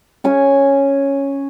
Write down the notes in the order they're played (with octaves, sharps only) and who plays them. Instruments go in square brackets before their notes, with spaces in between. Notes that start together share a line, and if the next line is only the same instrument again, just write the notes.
[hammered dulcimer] C#4 C#5 G#5